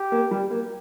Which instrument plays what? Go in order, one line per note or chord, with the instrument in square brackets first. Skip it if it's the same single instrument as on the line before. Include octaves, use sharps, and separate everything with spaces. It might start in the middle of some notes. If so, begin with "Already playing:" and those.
Already playing: [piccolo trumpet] G4
[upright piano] A#3
G3
A#3